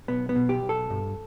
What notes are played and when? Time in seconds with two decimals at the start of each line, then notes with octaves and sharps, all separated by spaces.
0.08 B1 B3
0.29 B3
0.36 B2
0.49 G4
0.63 B1
0.69 A4
0.90 G2